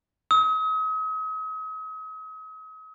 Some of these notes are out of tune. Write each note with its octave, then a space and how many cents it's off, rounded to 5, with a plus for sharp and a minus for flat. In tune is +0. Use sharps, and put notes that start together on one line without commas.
D#6 +40